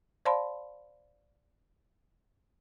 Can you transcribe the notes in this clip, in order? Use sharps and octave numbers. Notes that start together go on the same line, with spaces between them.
C5 D5 F5 A5 B5 C6